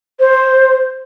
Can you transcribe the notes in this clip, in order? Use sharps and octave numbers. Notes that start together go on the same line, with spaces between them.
C5